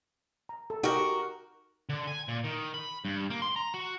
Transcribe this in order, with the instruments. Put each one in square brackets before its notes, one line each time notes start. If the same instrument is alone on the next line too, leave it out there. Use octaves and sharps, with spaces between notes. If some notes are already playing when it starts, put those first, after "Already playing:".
[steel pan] A#5
A4
[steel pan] D#4 G4 D#5 [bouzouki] F#4 A#4
[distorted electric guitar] D3
G#5
A#2
D#3
B5
G2
A#3
C6
A#5
F#4